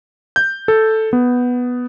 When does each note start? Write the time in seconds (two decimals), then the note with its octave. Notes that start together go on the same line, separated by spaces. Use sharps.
0.36 G6
0.68 A4
1.13 B3